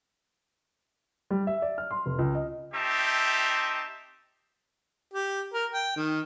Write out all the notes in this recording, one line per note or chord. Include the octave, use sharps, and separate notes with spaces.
G3
E5
D5
F6
C6
F1
C#2
D#5
C4 D#4 G4 E5 A5
G4
A#4
G5
D#3